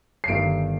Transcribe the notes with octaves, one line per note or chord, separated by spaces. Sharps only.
C7
G1 G2 D#3 D7